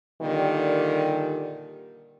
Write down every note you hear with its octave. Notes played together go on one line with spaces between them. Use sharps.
A#2 D3 D#3 G3 G4